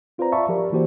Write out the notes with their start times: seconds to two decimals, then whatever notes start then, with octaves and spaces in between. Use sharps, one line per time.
0.18 C4 F4 B4 C5 D5 A#5
0.32 D5 E5 F5 A5 B5 C#6
0.48 F3 G4 A#4 D5
0.72 E3 A#3 F#4 G4 C5 D5